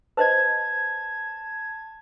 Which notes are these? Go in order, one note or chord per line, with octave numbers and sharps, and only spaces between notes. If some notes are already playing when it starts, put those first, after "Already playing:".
B4 C5 D#5 A5 G#6